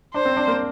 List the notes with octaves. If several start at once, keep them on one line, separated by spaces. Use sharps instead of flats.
D4 C5
C4
D4
A#3